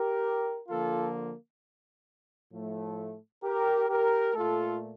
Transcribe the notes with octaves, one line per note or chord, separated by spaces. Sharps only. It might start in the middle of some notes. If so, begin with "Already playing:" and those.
Already playing: G4 A#4
D3 F3 A#3 F4 A4
A2 F3 A3
G4 A#4
G4 A#4
A#2 A3 F4 A4